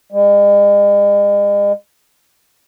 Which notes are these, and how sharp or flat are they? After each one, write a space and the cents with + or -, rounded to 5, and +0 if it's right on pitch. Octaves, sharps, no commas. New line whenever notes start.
G#3 -45